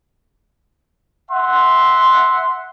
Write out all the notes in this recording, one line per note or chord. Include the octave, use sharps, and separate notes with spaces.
E5 F#5 C6